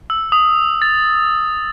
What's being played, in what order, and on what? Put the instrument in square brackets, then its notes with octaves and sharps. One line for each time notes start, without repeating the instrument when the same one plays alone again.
[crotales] E6
D#6
A6